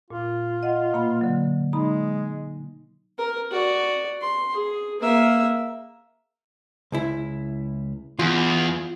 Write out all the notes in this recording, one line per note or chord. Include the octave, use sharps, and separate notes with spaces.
A#2 F4
D#5 F#5
B2 A#3 B5
D3 F#3
G#3 D#4 A#5 B5
A#4
F#4 D5
C6
G#4
A#3 E5
C#2 E4
E2 F4